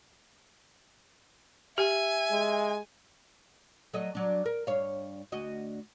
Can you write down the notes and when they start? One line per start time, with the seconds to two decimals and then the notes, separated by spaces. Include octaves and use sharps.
1.78 G4 E5 G#5
2.31 G#3
3.93 F#3 A3 D#5
4.15 F#3 D4
4.46 A#4
4.67 G2 C#5 F5
5.32 D2 F#4 D#5